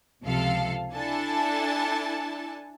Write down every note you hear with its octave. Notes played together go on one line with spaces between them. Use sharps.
C#2 C3 F3 A4 F5
D4 E4 A4 G#5 A5